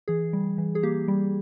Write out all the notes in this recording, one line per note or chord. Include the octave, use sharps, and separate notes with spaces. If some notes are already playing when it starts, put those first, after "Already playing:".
E3 G#4
G3
E3
G#4
A#3 G4
G3